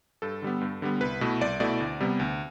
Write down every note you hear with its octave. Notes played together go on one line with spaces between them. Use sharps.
G2 A4
D3 G3 B3
G2
D3 G3 B3
C2 B4
B2 A3 E4
C2 D5
B2 A3 E4 D5
D2
C3 G3 B3
D2